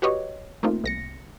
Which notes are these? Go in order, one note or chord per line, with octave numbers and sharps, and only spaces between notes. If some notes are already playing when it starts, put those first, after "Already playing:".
F#4 G4 B4 C#5 D#5
A3 A#3 C4 D#4 F4
C2 A#6 C#7